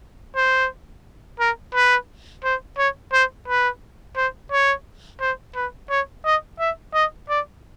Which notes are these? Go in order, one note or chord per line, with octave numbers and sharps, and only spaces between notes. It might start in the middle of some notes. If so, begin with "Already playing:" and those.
C5
A#4
B4
C5
C#5
C5
B4
C5
C#5
C5
B4
C#5
D#5
E5
D#5
D5